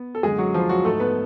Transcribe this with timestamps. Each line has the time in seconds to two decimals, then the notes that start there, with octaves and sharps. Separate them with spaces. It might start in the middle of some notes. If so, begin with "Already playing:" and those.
Already playing: B3
0.15 A4
0.23 F#2 D3 G#3 G#4
0.38 F#3 F#4
0.54 F3 F4
0.69 F#3 F#4
0.85 G#2 A3 A4
1.00 B3 B4